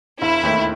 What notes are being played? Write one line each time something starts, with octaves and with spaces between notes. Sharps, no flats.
E1 E4
D#2 D#3 A3